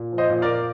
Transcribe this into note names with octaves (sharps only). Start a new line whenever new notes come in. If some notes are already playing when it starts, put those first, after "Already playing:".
Already playing: A#2
F3
C5 D#5
A#2
A#4 D5
A#2